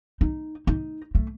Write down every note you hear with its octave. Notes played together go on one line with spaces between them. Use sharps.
D#4
D#4
A3